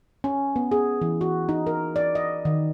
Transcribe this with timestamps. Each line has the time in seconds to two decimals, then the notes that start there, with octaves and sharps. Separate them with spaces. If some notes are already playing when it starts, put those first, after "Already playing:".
0.24 C#4
0.56 B3
0.71 G#4
1.01 E3
1.21 F#4
1.49 D#4
1.67 A#4
1.96 D5
2.15 D#5
2.45 D#3